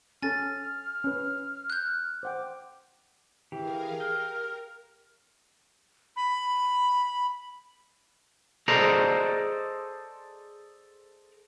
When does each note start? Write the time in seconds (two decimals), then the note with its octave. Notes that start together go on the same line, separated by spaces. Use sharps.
0.22 C#4 A4 G#5 F6 A6
1.04 C#4 B4
1.70 F#6 G6
2.23 C5 F#5 G5 D6
3.52 E3 G4 G#4 A#4 F5
4.00 A#4 G5 F6
6.16 B5
8.68 G#4 A4 C5 D5 D#5 A#5